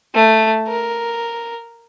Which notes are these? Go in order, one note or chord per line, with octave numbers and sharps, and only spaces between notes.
A3
A#4